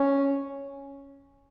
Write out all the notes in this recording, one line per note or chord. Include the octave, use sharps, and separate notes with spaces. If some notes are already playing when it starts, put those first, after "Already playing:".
Already playing: C#4